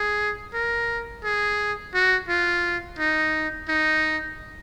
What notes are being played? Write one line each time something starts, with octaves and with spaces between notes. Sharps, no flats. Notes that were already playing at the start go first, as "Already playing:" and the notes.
Already playing: G#4
A#4
G#4
F#4
F4
D#4
D#4